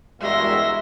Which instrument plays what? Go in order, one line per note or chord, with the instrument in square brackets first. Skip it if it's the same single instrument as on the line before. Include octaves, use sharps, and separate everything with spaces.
[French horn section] E2 G2 [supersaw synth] G#3 F#4 A#4 [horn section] E5 [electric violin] C6 A#6